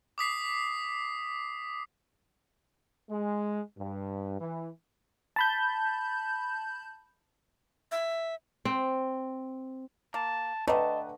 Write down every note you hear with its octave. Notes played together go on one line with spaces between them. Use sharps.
D6 D#6 B6 C7
G#3
G2
E3
A5 B5 G6
E5
C4
A#3 A5
D3 A3 B4 D#5 G5 A5 A#5